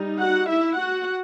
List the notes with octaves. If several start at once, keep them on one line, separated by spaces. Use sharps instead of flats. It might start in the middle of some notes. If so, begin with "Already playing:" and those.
Already playing: G3 D#4
F#4 F#5
E4 E5
F#4 F#5